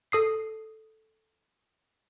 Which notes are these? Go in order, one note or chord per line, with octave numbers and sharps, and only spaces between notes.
A4 D#6 C7